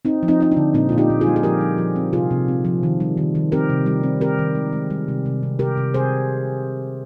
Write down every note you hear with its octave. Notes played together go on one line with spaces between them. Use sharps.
C4 D#4
F3
C4 D#4
C4 D#4
D4
D3
A#2 C4 D#4
F4
A#2
D#4 G4
A#2
F4 G#4
G3
G#4
F3 G4 A#4
F3
F3
C4
C3 F4 G#4
C3
C4
F3
D#3
G3
D#3
D#3
C4 G4 A#4
C3
G3
C4
C4 G4 A#4
D#3
G#3
G#3
G3
C3
C3
C3
C3 G4 A#4
C3
C3 G#4 C5